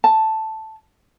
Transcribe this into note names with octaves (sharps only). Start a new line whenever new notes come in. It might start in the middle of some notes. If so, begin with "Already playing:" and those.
A5